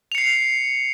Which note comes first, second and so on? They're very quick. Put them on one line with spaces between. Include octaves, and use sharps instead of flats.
F7 C#7 C7